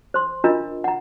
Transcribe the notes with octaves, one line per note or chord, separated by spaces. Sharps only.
C5 C6
D4 F4 A#4 D#5 A#5
F#5 A#5